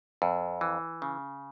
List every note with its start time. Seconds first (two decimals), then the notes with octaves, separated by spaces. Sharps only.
0.22 F2
0.61 E3
1.02 C#3